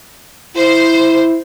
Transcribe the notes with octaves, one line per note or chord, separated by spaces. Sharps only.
E4 C5